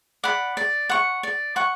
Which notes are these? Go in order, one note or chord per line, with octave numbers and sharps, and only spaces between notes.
D5 F#5 B5
D5
F#5 C#6
D5
F#5 C#6